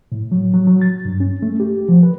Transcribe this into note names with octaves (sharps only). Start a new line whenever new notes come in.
A2
F#3
F#3
F#3
A6
G2
C#4
A3
G4
F3
B4